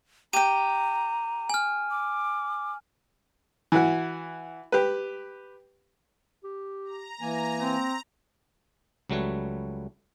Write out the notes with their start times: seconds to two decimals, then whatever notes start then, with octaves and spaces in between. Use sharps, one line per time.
0.33 G4 G5 A#5 D#7
1.50 G#5 F6
1.91 D6
3.72 E3 E4 F#4
4.72 G4 B4
6.44 G4
6.84 A#5
7.21 E3 A#3 G#5
7.58 C4
9.10 C#2 F#3 G3 A3 B4 C#5